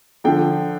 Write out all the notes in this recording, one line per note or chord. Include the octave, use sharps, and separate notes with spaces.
D3 F3 G5